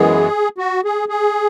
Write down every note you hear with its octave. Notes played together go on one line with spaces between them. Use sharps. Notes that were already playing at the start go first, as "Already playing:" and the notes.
Already playing: F#2 E3 G#3 B3 G#4
F#4
G#4
G#4